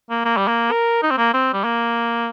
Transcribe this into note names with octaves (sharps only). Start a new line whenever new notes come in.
A#3
A#3
G3
A#3
A#4
D#4
C4
A#3
C4
G3
A#3